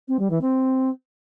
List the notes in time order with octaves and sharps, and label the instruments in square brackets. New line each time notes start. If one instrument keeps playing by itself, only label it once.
[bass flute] C4
G3
E3
C4